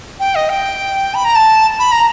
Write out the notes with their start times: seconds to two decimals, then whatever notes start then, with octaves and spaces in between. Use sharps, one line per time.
0.20 G5
0.35 D#5
0.50 G5
1.14 B5
1.25 A#5
1.35 A5
1.79 B5
1.92 A#5